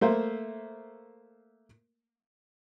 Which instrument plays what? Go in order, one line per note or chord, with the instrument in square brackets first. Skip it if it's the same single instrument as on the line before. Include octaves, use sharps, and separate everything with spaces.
[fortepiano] A3 A#3 C5 E5